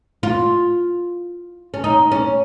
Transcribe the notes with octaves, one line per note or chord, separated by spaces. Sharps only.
F4
C#4
D#4
C#4